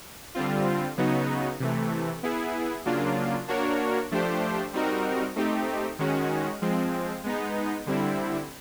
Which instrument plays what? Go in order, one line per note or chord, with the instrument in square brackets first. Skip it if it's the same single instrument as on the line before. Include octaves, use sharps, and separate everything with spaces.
[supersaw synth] D3 G3 C4 F4
C#3 F#3 B3 D#4 F#4
C3 E3 A3
B3 E4 G#4
C#3 F#3 A#3 D4 F4
A#3 D4 F#4 A#4 C#5
F3 A3 D4 G4 C5
G3 C4 D#4 F#4 A#4
A3 C4 D#4 G4
D#3 G#3 C#4 F#4
F3 G#3 C4
G#3 B3 D#4
D3 G3 C4 E4